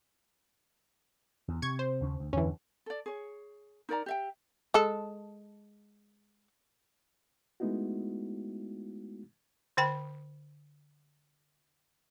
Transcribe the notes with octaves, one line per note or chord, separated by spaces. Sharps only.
E2
C3 C#6 G#6
C5
D#2 C#3 C#4
D2
E2 G2 D3 E3 C#4
A4 D5
G#4 C#5
D#4 A#4 D5 A#5
G4 E5 G5
G#3 A4
G#3 A3 B3 D#4 E4 F#4
D3 C5 G5 B5